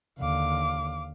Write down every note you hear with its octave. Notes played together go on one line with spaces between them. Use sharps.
D#2 D3 F5 D6